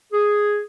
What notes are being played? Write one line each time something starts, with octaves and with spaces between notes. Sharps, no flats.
G#4